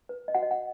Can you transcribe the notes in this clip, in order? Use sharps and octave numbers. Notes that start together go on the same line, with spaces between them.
B4
D#5
F#4 F#5
D#5
F#5